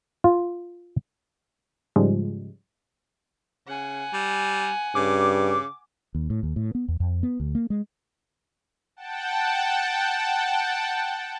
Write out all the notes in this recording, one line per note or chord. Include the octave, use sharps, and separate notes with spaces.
F4
G#2 C#3 F3 G3 G#3
C#3 F#5 G#5
G3
G2 C#3 D6
D#2
A2
D#2
A2
B3
E2
F2
B3
D2
A#3
G#3
F#5 G5 A5